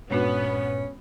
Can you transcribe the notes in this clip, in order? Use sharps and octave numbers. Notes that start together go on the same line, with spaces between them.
G2 A#2 G#3 B3 C#4 D4 F#4